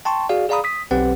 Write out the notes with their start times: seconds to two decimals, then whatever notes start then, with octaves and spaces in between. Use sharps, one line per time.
0.05 G5 A5 C6 C#6
0.29 F#4 G#4 D5 F5
0.49 G#4 D5 F5 A#5 B5 D#6
0.64 D#6 B6
0.91 B1 C4 G4 B4 F#5